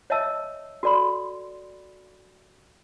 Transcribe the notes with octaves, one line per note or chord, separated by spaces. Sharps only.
C#5 D#5 E5 A5 E6
F#4 A4 D5 B5 C6